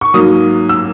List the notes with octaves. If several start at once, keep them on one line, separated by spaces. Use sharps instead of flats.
C#6
G#2 F#3 A#3 D#6
E6